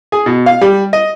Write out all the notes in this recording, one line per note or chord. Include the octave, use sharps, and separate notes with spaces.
G#4
B2
F5
G3
D#5